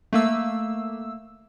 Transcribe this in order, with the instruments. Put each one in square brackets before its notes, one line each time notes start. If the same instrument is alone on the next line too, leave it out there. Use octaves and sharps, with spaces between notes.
[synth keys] A3 A#3 E6